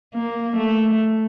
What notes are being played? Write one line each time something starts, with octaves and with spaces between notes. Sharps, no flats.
A#3
A3